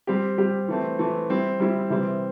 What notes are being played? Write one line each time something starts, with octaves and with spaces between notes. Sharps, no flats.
G3 C4 G4
G3 C4 G4
E3 A3 C4
E3 A3 C4
G3 C4 E4
G3 C4 E4
C3 E3 G3 C4